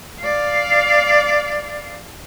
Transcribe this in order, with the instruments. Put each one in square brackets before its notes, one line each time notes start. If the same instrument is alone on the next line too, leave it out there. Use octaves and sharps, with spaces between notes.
[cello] D5 F5